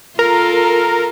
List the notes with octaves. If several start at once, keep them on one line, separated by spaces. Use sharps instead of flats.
F4 A4 A#4